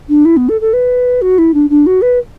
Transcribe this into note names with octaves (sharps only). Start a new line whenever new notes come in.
D4
E4
B3
A4
A4
B4
F#4
E4
D4
D4
F#4
B4